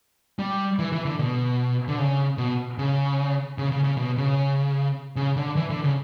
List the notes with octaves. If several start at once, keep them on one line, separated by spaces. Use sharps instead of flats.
G3
E3
E3
D3
B2
D3
C#3
B2
C#3
C#3
C#3
C#3
B2
C#3
C#3
D3
E3
D3
C#3